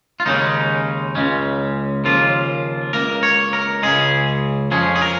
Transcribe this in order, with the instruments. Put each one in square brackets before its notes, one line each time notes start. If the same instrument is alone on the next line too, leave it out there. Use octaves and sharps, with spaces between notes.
[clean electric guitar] F4
D#2 C#3 G#3 C#4 D#4
C#2 C#3 G#3 C#4
D#2 C#3 F3 A#3 F4
C#2 C#3 A#3 A#4
C#5
A#4
C#2 C#3 G#3 G#4
F2 F3 C#4 G#4
G#4
A#4